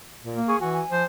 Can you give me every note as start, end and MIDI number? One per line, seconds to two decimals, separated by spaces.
0.23 0.40 46
0.36 0.55 58
0.48 0.56 68
0.48 0.56 85
0.60 0.82 52
0.60 0.82 66
0.60 0.71 80
0.73 1.04 80
0.90 1.04 53
0.90 1.04 72